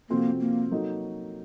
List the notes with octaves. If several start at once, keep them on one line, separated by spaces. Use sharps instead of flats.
C3 F3 A#3 C4 F#4 A4
A#3
F#3 A#3 D#4 F#4 A4